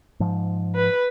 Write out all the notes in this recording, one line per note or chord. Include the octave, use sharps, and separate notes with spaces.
G#2 F3
B4